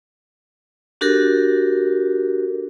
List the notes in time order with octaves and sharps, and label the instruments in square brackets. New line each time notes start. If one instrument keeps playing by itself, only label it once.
[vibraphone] D4 F#4 G4 A4 A#4